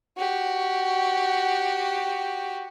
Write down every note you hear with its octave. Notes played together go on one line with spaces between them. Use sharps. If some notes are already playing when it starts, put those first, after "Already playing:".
F#4 G4